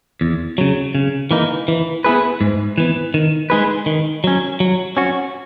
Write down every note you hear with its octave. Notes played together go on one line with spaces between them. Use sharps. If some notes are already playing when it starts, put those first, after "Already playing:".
E2
C#3 F#3
C#3
E3 A#3 D#4
E3
B3 E4 G#4 B4
G#2
E3 B3
D#3
G#3 D#4 G#4 B4
D#3
F#3 C#4
F#3
C#4 F#4